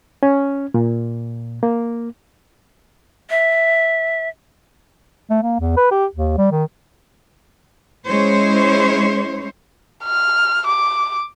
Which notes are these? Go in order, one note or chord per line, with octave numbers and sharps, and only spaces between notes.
C#4
A#2
A#3
E5
A3
A#3
E2
B4
G4
D#2
G3
D#3
G#3 C#4 E4 C5 C#5
F6
D6